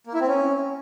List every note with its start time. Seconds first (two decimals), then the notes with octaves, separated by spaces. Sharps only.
0.07 A#3
0.14 E4
0.21 C4
0.27 C#4